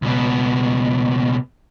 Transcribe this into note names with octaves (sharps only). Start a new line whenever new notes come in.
C#2 B2